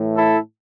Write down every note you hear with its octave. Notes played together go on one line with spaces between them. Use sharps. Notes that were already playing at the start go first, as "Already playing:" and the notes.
Already playing: A2 E3 A3
E4 A4